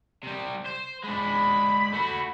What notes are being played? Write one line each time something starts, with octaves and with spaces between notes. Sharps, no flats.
C3 G3
C5
G#3 D4 B5
A3 F#4